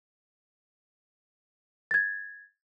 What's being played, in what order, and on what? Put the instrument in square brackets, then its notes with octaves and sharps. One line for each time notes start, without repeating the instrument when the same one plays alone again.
[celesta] G#6 A6